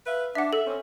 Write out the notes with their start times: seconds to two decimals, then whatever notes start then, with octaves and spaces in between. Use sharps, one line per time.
0.07 B4 E5 F5
0.35 D4 E5 F#5
0.53 A4 E5
0.67 C4 C#4